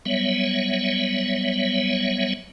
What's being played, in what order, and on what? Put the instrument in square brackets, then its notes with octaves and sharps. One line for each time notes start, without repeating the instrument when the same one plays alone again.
[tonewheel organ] F#3 G3 B3 C#5 E5